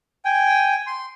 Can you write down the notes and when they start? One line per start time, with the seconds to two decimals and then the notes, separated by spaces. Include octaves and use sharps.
0.25 G5 G#5
0.87 C6